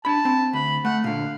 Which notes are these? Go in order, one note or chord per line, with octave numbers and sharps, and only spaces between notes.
D4 A5 B5
C4
D2 B5
A3 F#5
A#2 D3 F5